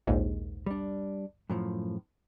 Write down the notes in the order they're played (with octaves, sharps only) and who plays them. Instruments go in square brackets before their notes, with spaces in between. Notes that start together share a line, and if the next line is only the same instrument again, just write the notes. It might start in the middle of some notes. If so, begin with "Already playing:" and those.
[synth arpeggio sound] A#1 D#2 G#2
[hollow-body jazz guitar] G3 D4
F#2 A2 F3